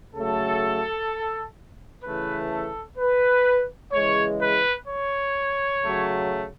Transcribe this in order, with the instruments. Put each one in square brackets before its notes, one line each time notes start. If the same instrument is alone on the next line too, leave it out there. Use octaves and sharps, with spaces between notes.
[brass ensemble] C#3 F#3 A3 A4
C#3 E3 A3 B4
A4
B4
C#3 E3 G#3 C#5
B4
C#5
C#3 F#3 A3